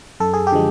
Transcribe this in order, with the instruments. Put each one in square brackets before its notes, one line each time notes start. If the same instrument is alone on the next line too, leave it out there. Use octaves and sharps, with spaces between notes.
[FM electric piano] F#2 A4
G#4
G4
D3 F3 G#3